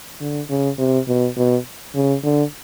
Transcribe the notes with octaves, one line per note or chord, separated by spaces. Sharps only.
D3
C#3
C3
B2
B2
C#3
D3